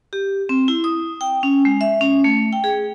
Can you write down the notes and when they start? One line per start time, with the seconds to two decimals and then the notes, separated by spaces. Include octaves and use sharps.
0.13 G4
0.49 C4
0.68 E4
0.84 D#6
1.21 G5
1.43 C#4
1.65 G#3
1.81 E5
2.01 C#4
2.24 A3
2.53 G5
2.64 G#4